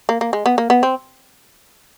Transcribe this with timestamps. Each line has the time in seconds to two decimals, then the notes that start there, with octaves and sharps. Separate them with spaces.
0.09 A#3
0.21 A#3
0.33 G#3
0.46 B3
0.58 A#3
0.70 B3
0.83 C4